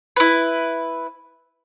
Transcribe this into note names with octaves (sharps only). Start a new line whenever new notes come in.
E4 B4